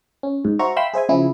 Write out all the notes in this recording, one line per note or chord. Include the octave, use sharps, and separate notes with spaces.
C#4
G#2
F#4 C5 E5 A#5 C#6
E5 F5 G5 B5 C6 E6
G#4 C5 E5 G#5
C#3 F3 E4 G#4